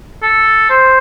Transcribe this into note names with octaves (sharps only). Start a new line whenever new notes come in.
A4
C5